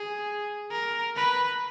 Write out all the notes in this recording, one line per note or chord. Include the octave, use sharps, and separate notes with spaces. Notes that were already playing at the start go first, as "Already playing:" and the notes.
Already playing: G#4
A#4
B4